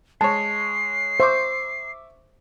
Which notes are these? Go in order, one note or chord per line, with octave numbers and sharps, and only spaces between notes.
G#3 C#5 A5 C7
C5 E5 C#6 D6